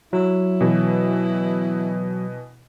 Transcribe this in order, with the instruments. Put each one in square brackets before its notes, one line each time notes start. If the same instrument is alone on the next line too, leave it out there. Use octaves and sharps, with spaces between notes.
[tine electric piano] F#3 [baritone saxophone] E4
[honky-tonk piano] B2 E3